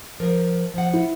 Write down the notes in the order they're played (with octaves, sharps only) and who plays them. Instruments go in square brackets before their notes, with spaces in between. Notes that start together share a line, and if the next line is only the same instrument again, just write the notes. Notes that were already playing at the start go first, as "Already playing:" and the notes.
[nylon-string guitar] F3 A#4
F3 F#5
[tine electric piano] E4